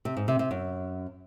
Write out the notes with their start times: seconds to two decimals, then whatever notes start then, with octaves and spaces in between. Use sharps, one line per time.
0.05 C3
0.17 G#2
0.28 C3
0.39 C3
0.51 F#2